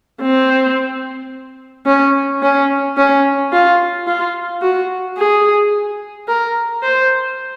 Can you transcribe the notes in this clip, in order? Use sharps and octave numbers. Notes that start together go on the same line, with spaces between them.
C4
C#4
C#4
C#4
F4
F4
F#4
G#4
A#4
C5